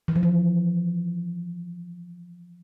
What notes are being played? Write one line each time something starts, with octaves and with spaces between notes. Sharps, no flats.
E3
F3
E3